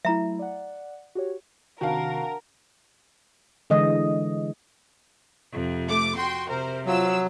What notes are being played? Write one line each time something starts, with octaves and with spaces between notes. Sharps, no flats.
F#3 A3 E4 E5 A#5
D5 F#5
F#4 G4 C#5
C3 D#3 D4 F#4 A#4 F5 F#5 A5
D3 E3 G#3 D#5
F2 C3
A3 D6
F#4 G5 C6
C3 A#4 C5
F3 F#3 F5 E6